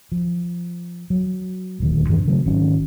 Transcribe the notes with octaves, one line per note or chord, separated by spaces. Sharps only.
F3
F#3
D#1 D2 D#3
G2 D#3 E3 D4
C#3 F#3 A3
G#1 D#3 F#3 C#4